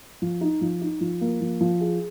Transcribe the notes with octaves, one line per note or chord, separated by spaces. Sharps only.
F3
D#4
F3
D#4
F3
A#3
F3
F3
G#4